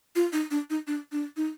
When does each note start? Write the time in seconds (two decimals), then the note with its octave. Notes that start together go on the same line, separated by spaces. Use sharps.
0.15 F4
0.32 D#4
0.51 D4
0.70 D#4
0.87 D4
1.12 D4
1.37 D#4